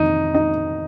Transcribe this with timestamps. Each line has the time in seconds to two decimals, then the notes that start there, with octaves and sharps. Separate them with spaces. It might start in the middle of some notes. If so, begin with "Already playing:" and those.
Already playing: F2 D#3 D#4
0.35 D#4